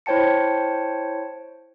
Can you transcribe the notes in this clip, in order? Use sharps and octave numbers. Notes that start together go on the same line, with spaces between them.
E4 C5 C#5 G5 A5 C#7